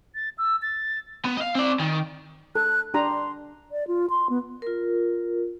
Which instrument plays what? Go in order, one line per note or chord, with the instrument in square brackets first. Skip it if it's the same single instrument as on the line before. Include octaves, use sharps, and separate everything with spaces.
[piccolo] A6
E6
A6
[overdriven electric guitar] B3
D#5 F5
C4 D5
D#3
[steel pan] A4 [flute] F#6
[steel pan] D4 G4 A#5 [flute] C6
[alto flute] D5
F4
C6
B3
[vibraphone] F4 A#4